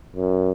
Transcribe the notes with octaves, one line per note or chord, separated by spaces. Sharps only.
F#2